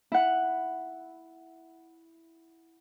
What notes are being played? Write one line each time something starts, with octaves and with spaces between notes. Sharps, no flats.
E4 F#5